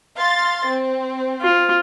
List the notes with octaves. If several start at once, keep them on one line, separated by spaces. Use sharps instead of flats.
F5 C6 A6
C4
F4